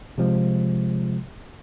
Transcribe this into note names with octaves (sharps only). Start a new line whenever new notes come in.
C3 F3 G#3